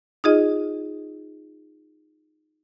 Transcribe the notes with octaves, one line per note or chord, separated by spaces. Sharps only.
D#4 F4 G#4 D#5